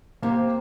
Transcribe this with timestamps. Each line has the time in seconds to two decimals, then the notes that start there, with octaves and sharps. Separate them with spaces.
0.22 C3 A#3